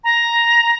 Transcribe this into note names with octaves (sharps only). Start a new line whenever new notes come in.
A#5